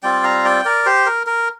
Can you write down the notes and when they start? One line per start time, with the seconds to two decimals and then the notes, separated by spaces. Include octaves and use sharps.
0.03 G3 C4 F4 D5 G5
0.23 F5 A#5
0.45 D5 G5
0.65 A#4 D5
0.86 G4 C5
1.06 A#4
1.27 A#4